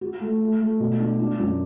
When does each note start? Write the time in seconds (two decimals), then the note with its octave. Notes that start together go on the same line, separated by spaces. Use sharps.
0.01 F#4
0.20 A3
0.41 A3
0.60 A3
0.80 B2
0.99 D4
1.19 D4
1.39 F#2